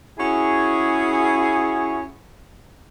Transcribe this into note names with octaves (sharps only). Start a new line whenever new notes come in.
C#4 E4 F#4 G#4